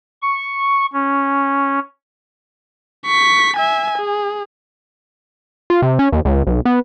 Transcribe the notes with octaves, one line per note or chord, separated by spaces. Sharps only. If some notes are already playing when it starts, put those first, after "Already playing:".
C#6
C#4
C#6 B6
E5 G#5
G#4
F4
C3
C#4
D#2
C#2
B1
B3